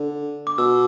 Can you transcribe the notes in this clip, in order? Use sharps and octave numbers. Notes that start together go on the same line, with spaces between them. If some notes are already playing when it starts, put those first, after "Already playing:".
Already playing: D3
D6
B2 E6